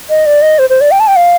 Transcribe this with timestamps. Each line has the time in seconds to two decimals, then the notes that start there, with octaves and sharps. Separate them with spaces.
0.10 D#5
0.26 D5
0.42 D#5
0.59 C5
0.70 C5
0.81 D5
0.91 G5
1.00 A5
1.07 G5
1.16 F5